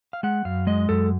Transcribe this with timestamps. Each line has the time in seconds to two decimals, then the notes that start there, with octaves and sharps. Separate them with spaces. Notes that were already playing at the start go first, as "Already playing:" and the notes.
0.13 F5
0.23 G#3 F#5
0.45 F#2 F5
0.67 G#3 D#5
0.89 F#2 A4